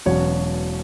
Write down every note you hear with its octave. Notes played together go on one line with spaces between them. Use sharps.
E1 E2 B2 F#3 C#4 C#5